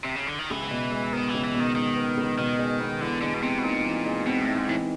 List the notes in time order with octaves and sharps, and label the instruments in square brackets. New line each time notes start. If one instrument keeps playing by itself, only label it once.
[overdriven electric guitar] C3
C#3
D3
D#3
[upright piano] C#2 [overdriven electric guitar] E3
[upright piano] B2
G#3
[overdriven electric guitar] D#3 [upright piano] B3
[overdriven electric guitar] E3
[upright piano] C#2
[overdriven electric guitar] E3
[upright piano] B2
[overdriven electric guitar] D#3
[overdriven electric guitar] D#3 [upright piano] G#3
[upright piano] B3
C#2
[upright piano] B2 [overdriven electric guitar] D#3
[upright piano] G#3
B3
[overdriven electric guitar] D3 [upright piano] E3
[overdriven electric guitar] D3 [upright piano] G#3
[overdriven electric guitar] B2
[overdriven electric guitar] C3 [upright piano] C4
[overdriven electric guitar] B2
[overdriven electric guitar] A#2 [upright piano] D#4
[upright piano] E3
G#3
[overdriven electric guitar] B2 [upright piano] C4
[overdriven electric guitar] A2
[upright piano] D#4
[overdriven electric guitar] G#2
[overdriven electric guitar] A2 [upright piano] E3